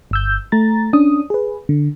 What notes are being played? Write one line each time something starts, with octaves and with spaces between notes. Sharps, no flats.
G1 E6 G6
A3 A#5 A6
C#4 D4 D#6
G#4 B4
D3